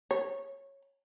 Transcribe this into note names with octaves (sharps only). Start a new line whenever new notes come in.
C#5